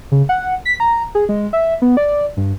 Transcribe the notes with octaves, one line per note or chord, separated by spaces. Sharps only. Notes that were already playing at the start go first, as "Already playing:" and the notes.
C#3
F#5
B6
A#5
G#4
G#3
E5
B3
D5
G2